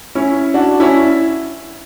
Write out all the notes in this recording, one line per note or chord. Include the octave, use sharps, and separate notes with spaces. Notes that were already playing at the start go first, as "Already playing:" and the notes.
C#4 E4
D4 F#4
C#4 E4